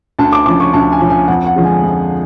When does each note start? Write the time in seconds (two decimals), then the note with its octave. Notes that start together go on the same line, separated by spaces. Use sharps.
0.19 D2 A5
0.33 D6
0.46 C#3 F3 D6
0.60 C#6
0.73 D2 A5
0.92 G#5
1.01 C#3 F3
1.10 G#5
1.28 F2 F#5
1.46 F#5
1.56 D3 F3 G#3
1.65 G#5
1.84 F2